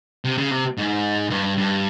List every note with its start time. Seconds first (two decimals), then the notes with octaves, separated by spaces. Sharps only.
0.25 C3
0.38 C#3
0.51 C3
0.78 G#2
1.31 G2
1.57 G2